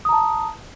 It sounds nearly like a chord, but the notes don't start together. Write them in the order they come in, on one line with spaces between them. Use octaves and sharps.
D#6 A#5 A5